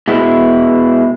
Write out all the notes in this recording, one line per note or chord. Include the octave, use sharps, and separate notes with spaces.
B2 G#3 B3 E4